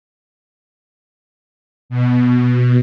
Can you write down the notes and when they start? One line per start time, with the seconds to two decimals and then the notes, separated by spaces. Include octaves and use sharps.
1.90 B2